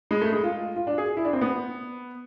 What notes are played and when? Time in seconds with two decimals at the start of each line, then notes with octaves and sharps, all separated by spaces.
0.11 G#3
0.21 A3
0.32 G#3
0.44 F4
0.76 F4
0.87 D4
0.98 G#4
1.17 E4
1.25 D4
1.33 C4
1.41 B3